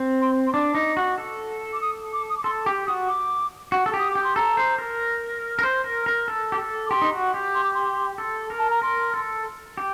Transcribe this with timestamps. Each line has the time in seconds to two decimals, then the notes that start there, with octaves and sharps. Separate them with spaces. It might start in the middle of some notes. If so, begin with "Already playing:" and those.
Already playing: C4
0.22 C6
0.47 C6
0.54 D4 D6
0.75 D#4
0.97 F#4
1.18 A4
1.73 D6
1.81 D#6
2.13 D6
2.30 D#6
2.37 D6
2.44 A4 C6
2.66 G4 D6
2.87 F#4 D#6
3.08 D6
3.72 F#4
3.86 A4
3.94 G4 D#6
4.11 G4 D6
4.24 C6
4.36 A4 A#5
4.57 C5
4.78 A#4
5.59 A#4
5.63 C5
5.84 A#4
6.06 A#4
6.28 A4
6.52 G4
6.59 A4
6.86 D6
6.91 G4 C6
7.02 D#4
7.12 F#4
7.34 G4
7.55 C6
7.64 D6
7.74 C6
8.18 A4
8.50 A#4
8.59 A5
8.70 A#5
8.82 A#4 C6
9.14 A4
9.78 G4